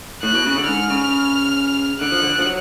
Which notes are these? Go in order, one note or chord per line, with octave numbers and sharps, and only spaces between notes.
A2 F#6
B2
C#3
D3
G#2 F6
C#3
D3 F#6
F3
D3
F3
F#3